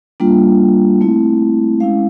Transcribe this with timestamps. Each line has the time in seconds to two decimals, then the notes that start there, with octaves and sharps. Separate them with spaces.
0.20 G3 A#3 D4 F4
1.01 A3 C4 E4
1.80 G#3 C#4 E4 F5